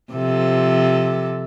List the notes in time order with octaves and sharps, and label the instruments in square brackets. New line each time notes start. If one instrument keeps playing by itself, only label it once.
[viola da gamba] C3 F3 A4